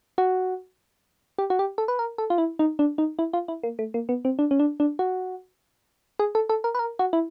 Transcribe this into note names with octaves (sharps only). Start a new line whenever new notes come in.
F#4
G4
F#4
G4
A4
B4
A#4
A4
F4
E4
D#4
D4
D#4
E4
F4
E4
A#3
A3
A#3
B3
C4
D4
C#4
D4
D4
F#4
G#4
A4
A4
A#4
B4
A#4
F#4
E4